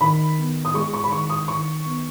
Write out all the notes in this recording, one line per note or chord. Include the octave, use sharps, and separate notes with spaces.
D#3 B5
B3
D#6
G#3 C#6
C#6
B5
D#3 C#6
D#6
D#3 C#6
B3